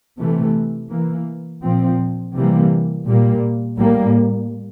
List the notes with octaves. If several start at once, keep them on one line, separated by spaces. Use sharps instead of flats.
C3 E3 A3
E3 A#3
A#2 F3 C4
C3 E3 G3 A#3
A#2 G3 A#3
A2 G3 A#3